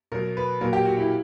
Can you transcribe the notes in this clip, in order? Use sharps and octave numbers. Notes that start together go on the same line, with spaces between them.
B2 F#3 A#4
B4
A#2 F#3 A#4
G4
F#4
E4